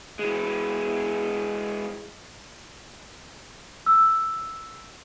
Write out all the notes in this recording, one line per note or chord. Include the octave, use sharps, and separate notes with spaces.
E3 G#3
E6